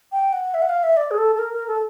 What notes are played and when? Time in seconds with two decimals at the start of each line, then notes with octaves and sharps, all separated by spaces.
0.12 G5
0.33 F#5
0.54 E5
0.62 F#5
0.69 F5
0.83 E5
0.97 D5
1.11 G#4
1.18 A4
1.35 A4
1.39 A#4
1.53 A#4
1.68 A4